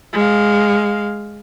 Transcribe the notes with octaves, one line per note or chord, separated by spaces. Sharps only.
G#3 F5